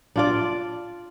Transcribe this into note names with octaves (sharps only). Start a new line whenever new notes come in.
D4 F4 D5